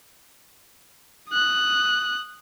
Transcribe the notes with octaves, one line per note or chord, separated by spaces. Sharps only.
D#6 F#6